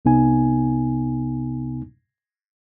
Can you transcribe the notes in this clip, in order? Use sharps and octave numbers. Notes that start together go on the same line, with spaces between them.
C2 C3 B3 D#4 G#5